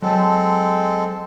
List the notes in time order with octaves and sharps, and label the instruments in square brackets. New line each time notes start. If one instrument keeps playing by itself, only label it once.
[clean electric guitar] F#3 A5 [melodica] G#3 C4 A4